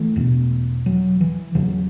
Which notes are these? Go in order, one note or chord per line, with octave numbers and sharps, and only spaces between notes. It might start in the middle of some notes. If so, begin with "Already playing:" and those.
Already playing: E3 A3
E2 B2
F#3
E3
E2 C#3 F#3